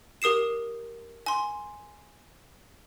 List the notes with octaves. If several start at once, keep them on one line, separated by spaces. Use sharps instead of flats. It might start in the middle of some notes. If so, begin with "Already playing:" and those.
G4 A#4 D#6 C7 E7
G#5 C6